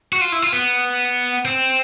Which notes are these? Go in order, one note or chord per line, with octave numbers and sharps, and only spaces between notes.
F#4
F4
E4
F4
B3
C4